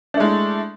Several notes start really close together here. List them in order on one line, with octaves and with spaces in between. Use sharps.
D4 A3 G#3 E4